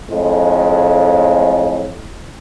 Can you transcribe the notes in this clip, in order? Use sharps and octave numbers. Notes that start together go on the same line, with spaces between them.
F2 A2 G#3